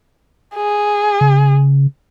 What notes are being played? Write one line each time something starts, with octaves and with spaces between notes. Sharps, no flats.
G#4
C#3